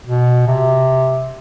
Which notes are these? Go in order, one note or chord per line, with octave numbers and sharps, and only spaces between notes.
B2
C3